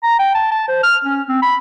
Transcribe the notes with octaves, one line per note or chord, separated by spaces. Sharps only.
A#5
G5
A5
A5
C5
F6
C#4
C4
B5